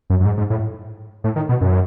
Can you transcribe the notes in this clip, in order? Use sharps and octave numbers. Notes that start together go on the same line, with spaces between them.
F#2
F#2
G#2
G#2
A2
A2
D#3
B2
F#2